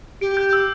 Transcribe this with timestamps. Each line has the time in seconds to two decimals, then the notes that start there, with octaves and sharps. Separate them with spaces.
0.21 G4 D7
0.37 G6
0.53 E6